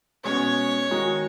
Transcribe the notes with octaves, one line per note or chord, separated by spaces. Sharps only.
B2 G#3 C#4 C#5
D#3 G#3 D#4 F#4